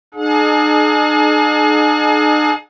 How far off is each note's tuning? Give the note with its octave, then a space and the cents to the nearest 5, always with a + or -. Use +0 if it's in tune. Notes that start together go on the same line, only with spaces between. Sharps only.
D#4 -45 G#4 +35 F#5 -40